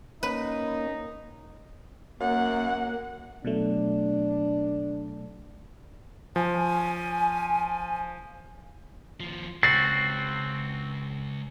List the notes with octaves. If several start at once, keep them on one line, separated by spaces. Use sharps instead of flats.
A#3 C#4 D#4 B4
F#2 A#3 F#5
B2 F#3 A3 D4
F3 G#5
D#2 F3
C#2 C4 F#4 A6 C7